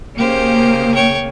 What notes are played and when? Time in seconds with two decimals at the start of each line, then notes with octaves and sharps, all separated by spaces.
0.18 C#3 A#3 G4 C5
0.95 C#5 G5